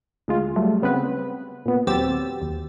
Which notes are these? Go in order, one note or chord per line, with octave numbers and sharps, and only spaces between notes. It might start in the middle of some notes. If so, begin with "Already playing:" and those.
D2 G#3 F4
F#3 G3 A3
C#3 B3 C4 B4
A#2 B3
D#2 F#3 C4 G4 E6 A6
D#2